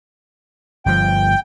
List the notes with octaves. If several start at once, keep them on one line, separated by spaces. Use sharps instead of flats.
G1 F3 G5